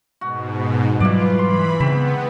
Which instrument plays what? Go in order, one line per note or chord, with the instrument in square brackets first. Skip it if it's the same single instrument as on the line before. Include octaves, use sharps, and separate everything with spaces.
[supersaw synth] G#2 B2 [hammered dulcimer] F#4
[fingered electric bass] G#2 F#3 G3 [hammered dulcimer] E3 D5 [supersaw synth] F4
[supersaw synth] E3 B5 [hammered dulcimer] C6
[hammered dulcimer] G#2 C4 B5 [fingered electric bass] C#3 [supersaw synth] B3